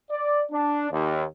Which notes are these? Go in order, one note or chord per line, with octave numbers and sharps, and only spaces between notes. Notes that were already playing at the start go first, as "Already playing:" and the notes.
D5
D4
D#2